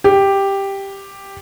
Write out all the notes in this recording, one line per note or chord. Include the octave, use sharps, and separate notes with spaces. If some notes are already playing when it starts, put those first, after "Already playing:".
G4